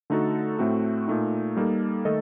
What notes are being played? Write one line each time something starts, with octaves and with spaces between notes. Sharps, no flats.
D3 A3 D#4 F#4 A4
A2 A3 C4 F#4
A#2 A3 D#4
G3 A#3 D#4 A4
D#3 A3 D#4 A4 D#5